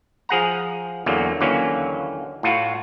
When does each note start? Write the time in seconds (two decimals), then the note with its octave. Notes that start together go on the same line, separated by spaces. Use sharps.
0.29 F3 G#4 F#5 A#5
1.06 E2 D3 F#3 A#3
1.41 D#2 D3 E3 F#3 A#3 C#4
2.43 A2 F4 F#4